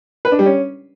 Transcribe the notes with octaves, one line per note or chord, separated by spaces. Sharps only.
B4
D4
G3
C#4